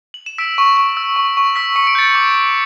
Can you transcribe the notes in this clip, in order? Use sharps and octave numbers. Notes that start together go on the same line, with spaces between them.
F#7
E7
E6 B6 D7
C#6
C#6
E6
C#6
C#6
E6 B6
C#6 C#7
D7
G6 A6 C#7
D6
D6